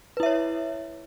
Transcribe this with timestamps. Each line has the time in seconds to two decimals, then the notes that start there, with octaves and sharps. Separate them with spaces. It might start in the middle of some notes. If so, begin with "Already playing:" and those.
0.17 B4
0.20 E4
0.23 E5
0.26 C#5